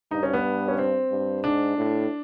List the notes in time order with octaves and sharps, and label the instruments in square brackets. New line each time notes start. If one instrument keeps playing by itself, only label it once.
[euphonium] G2 [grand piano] D#4
[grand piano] C#4
B3
C#4
C4
[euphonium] G2
[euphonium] G#2 [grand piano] D4
[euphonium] A2